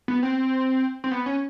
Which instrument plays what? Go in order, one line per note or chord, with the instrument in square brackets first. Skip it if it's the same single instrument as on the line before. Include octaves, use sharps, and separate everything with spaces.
[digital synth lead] B3
C4
C4
B3
C#4